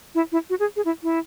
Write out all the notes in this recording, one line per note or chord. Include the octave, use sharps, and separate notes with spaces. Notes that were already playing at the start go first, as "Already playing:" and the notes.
E4
E4
F#4
G#4
G#4
E4
E4